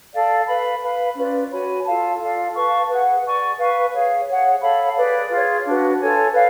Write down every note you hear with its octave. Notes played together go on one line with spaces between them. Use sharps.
A4 D5 F5
B4 F5 B5
B4 F5 B5
C#4 F4 B4 D5
F#4 C#5 G#5 B5
F4 A4 F5 A5
F4 A4 D5 F5
B4 F5 A5 C#6
G#4 B4 F#5
G#4 D5 G#5 C#6
B4 F5 G#5 C#6
G#4 C#5 F5
G#4 C#5 F#5
A4 C#5 F5 B5
G#4 B4 D5
F4 G#4 C#5
D4 F#4 B4
F4 A4 C#5 G#5
B4 D5 F5